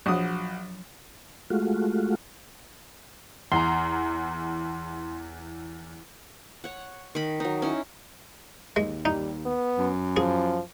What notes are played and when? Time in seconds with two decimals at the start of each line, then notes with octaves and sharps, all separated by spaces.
0.06 A#1 F3 F#3 F#4 D#6
1.50 G#3 A3 F4 F#4
3.52 E2 A#5 C6
6.64 C#5 F#5
7.15 D#3 B5
7.40 F#3 D#4
7.62 C#4 D#4 E4
8.76 D#2 G#3
9.05 G3 D#4
9.46 B3
9.78 F#2
10.17 F3 G#4